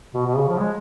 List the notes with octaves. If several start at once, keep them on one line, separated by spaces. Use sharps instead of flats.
B2
B2
C#3
F3
G#3